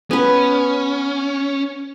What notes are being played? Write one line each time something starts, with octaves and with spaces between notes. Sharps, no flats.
B3 C#4 B4